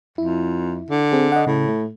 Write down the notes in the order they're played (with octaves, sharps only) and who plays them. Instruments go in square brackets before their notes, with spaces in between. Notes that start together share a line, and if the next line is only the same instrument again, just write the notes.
[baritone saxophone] F2 [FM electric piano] E4
[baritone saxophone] D3
[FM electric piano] C4 G#4
D#5 F#5
[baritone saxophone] A2 [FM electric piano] C#3
[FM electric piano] A3